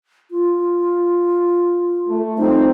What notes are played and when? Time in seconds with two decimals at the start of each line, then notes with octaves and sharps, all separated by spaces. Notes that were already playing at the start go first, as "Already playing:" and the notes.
0.31 F4
2.08 A3
2.38 F3 G3 C4 D#4